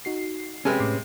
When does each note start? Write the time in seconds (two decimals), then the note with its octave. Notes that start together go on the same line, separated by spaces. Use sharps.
0.05 D#4 F#4 C7
0.65 C3 G#3 C#4 B4 G#5
0.80 A2 D6 C7